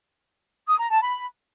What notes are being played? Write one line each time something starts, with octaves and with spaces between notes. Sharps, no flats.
D#6
A#5
A5
B5